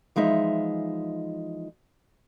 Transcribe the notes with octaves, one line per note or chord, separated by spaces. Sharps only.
E3 F3 G#3 D#4 E5